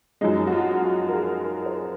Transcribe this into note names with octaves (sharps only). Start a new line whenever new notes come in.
F#2 F3 G#3 D#4
F#4
F4
F#4
A#4
G#4
A#4
C5
A#4